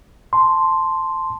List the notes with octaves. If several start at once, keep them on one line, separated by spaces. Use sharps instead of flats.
A5 C6